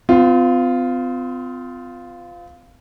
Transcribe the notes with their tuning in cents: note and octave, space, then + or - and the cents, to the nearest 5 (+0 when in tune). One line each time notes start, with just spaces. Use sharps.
C4 -45 F4 +0